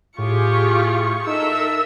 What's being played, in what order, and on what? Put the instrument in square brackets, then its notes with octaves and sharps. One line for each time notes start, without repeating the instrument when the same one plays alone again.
[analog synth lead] A2 [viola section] F4 G4 G#4 [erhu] C#6
[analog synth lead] D#4 [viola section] A4 A#4 E5 [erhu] E6